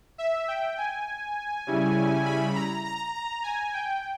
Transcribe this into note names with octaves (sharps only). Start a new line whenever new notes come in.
E5
G5
G#5
C#3 G3 C#4 E4
B5
A#5
A#5
A#5
G#5
G5